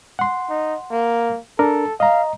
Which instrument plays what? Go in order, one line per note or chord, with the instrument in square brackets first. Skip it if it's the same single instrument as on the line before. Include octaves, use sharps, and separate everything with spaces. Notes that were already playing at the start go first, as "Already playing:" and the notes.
[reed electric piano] F#5 C6
[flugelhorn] D#4
A#3
[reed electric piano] D4 A#4 [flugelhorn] A4
[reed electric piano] D#5 A#5 [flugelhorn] F5